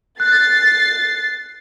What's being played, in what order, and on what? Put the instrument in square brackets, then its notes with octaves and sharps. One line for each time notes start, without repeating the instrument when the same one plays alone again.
[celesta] F#6 [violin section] A6 C7